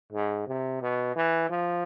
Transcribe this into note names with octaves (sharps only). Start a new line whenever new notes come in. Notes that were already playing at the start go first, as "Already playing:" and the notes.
G#2
C3
B2
E3
F3